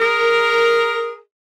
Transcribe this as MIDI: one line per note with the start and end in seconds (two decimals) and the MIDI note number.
0.01 1.18 68
0.01 1.18 70